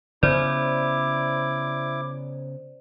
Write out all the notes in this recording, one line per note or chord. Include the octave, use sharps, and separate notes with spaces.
C#3 B3 E4 C5 D5 D6